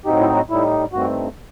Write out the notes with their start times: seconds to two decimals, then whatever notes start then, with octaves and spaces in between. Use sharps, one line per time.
0.05 A2 F#3 C4 D#4 G4
0.20 E4
0.35 F#4
0.50 A2 G3 D#4 E4
0.93 G2 D#3 A3 C4 F#4